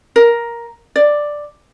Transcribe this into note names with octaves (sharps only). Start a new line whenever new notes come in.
A#4
D5